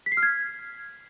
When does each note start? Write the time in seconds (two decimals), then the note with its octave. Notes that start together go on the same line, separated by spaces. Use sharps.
0.06 B6
0.12 C7
0.17 F6
0.23 G#6